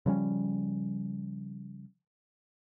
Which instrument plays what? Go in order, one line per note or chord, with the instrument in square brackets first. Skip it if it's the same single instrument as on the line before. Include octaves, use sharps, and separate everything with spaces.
[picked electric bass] C#3 F3 G3 C#4